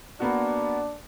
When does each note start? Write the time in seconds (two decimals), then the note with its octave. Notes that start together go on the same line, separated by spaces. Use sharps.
0.20 A#3 B3 D4 F#4